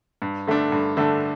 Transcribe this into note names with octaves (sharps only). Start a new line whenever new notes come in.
G2
D3 A3 D4
G2
D3 A3 D4